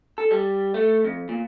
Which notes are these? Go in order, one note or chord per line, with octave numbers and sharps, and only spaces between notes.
A4
G3
A3
F2
A#2